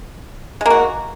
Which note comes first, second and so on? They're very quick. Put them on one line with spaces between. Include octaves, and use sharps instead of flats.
G#3 A#3 F#4